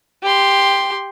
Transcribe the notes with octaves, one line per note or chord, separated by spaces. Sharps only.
G4 C6